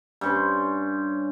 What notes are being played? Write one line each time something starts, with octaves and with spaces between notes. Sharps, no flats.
G2 C#4 C5